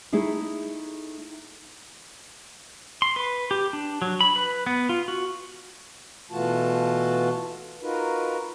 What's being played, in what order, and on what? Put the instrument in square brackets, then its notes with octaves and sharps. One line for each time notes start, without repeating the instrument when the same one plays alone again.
[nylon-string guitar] A3 D#4 E4 G#4 A4
[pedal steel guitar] C6
B4
G4
D4
F#3
B5
B4
B3
F4
F#4
[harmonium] B2 E3 A3 F4 F#4 A5
D#4 F4 F#4 A#4 B4